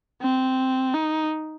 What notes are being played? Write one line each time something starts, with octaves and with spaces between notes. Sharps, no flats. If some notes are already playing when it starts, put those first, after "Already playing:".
C4
D#4